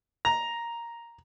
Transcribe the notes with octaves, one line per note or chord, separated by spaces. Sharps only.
A#5